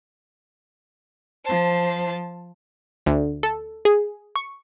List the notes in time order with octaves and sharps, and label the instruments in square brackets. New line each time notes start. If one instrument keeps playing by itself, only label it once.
[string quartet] F3 C5 A5
[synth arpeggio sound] D2
A4
G#4
C#6